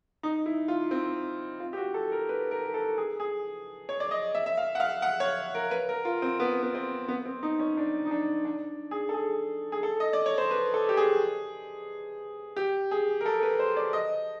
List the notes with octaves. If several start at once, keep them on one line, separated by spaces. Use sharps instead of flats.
D#4
E4
F4
C4
F4
G4
F#4
A4
A#4
B4
A#4
A4
G#4
G#4
C#5
D5
D#5
E5
E5
F5
F#5
F5
F#5
C#5
A#4
B4
A#4
F4
C4
B3
B3
C4
B3
C4
D#4
C#4
D4
D#4
D4
D4
G#4
A4
G#4
G#4
A4
D#5
D5
C#5
C5
B4
A4
G4
G#4
G4
G#4
A#4
A4
B4
C5
D5
D#5